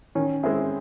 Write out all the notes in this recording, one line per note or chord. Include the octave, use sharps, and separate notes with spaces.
D#3 C#4
G#3 C4 E4 G#4